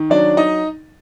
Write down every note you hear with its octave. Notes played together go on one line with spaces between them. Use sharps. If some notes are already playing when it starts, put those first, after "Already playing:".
Already playing: D#3
F#3 D4 D5
D#4 D#5